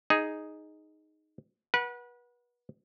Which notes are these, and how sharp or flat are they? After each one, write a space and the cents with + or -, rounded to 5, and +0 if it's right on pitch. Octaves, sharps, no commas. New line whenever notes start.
D#4 +0 G#4 +0
B4 -30 F#5 +0